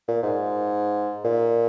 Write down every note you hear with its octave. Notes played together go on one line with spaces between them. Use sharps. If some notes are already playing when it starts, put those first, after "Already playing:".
A#2
G#2
A#2